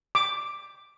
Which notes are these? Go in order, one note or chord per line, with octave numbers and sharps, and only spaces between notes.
D6